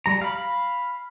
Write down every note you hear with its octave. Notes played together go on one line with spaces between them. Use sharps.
G3 A#5
F5 B5